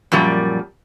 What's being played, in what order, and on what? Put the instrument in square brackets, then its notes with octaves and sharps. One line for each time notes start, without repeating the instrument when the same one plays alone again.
[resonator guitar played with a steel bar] F#2 A#2 F3 G3